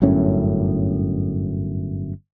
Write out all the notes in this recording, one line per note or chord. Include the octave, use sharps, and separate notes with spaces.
G1 F#2 A2 C#4